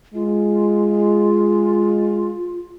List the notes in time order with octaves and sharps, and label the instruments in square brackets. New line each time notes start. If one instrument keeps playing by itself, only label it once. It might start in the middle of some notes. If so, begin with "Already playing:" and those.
[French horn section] G#3 [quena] F4